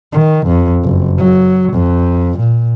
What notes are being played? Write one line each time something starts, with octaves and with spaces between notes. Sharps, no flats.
D#3
F2
F#1
F#3
F2
A#2